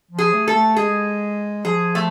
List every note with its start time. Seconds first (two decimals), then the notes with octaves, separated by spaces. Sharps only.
0.11 F3
0.18 G#4
0.33 A3
0.48 A4
0.55 A3
0.76 G#3 G#4
1.65 F3 G#4
1.95 A3